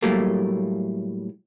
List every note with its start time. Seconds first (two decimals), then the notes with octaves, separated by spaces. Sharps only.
0.02 A2 F#3 G3 A3 A#3